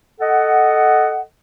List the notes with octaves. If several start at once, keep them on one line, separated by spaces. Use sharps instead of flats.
A4 D#5 F#5